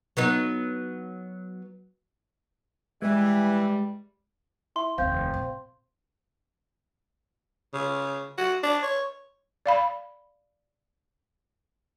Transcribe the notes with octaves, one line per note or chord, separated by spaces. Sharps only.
F#3 B3 D#4
E3 G3 G#3
E4 C6
F1 D#2 C4 F5 G6
A#2
C#3
F#4
D4
C#5
D5 F5 B5